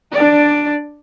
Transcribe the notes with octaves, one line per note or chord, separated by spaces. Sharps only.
D4 D5